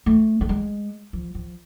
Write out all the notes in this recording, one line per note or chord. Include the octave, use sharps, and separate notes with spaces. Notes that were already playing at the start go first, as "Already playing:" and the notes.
A3
A3
G#3
F3
F3